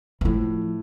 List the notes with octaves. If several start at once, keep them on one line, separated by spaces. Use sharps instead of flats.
E3
A2 F3